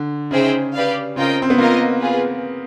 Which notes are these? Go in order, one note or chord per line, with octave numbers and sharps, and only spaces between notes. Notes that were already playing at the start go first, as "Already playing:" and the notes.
Already playing: D3
C#3 D#4 G#4 C5 E5 G5
G4 B4 D5 F5
C#3 C4 F4 A#4 D#5 G5
C4
B3
A#3 F4 A#4 D#5
F4 G#4 B4